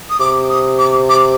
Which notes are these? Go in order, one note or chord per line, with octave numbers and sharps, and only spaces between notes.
D#6
C3 D6
D#6
D6
D6